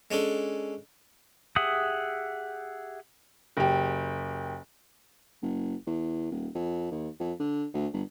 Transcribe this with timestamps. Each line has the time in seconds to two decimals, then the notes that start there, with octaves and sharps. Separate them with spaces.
0.11 G#3 C#4 D4 A4
1.56 G4 G#4 E5 F#5 D#6
3.57 F#1 G4
5.42 F#1
5.87 E2
6.31 D#1
6.55 F2
6.91 D#2
7.20 F2
7.40 D3
7.74 D2
7.93 G1